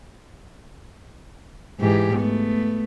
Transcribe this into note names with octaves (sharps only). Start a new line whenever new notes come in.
G#2 E3 G4
A3 B3